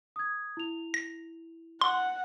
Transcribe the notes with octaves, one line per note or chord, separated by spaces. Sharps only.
D#6 G#6
E4 F7
A#6
F#5 C6